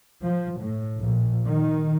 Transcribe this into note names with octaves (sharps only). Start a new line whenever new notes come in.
F3
A2
A#1
D#3